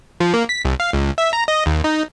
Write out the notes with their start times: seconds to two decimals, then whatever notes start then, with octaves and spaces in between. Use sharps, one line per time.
0.20 F3
0.34 A#3
0.49 B6
0.65 C2
0.80 F5
0.93 C#2
1.18 E5
1.33 A#5
1.48 D#5
1.66 D#2
1.84 D#4